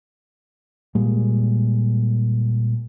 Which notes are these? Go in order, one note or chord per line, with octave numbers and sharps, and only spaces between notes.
A#2 G3 G#3